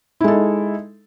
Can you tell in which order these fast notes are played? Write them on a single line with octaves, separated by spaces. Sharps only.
E4 G#3 A4 D#4